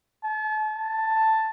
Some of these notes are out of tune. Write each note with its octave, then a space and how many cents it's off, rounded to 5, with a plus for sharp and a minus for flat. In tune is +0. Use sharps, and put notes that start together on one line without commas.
A5 -40
A5 +5